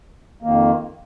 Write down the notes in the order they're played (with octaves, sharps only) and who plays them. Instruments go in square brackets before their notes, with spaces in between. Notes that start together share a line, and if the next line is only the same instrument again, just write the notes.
[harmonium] F2 D#3 A#3